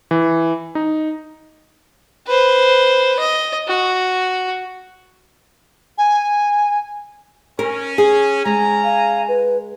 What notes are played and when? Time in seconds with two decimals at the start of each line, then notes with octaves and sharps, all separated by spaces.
0.11 E3
0.75 D#4
2.27 B4 C5
3.19 D#5
3.68 F#4
5.98 G#5
7.59 C#4 A#4
7.98 G#4
8.45 G#3 C#4 G#5 A#5
8.84 F5
9.28 B4